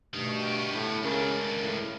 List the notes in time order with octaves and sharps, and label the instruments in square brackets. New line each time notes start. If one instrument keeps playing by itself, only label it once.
[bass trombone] G2 [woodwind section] B2 A3 [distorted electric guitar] D#3
[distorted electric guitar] B3 G4
[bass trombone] A2
[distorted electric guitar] C#2 D4 [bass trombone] C#3 [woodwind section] A#4
[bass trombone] A2